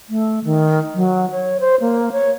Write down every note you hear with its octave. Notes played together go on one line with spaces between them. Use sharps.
A3
D#3
F#3
C#5
C5
A#3
C#5